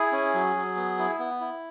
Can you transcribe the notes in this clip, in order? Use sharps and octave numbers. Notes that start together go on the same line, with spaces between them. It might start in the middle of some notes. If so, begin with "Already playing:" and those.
Already playing: E4 G#4
C#4
F#3
F#3
B3
E4
B3
E4